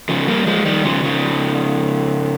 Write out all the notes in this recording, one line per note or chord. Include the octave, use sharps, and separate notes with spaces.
C#3 F3
G3 A#3
F3 G#3
D#3 G3
C#3 F3
C#3 F3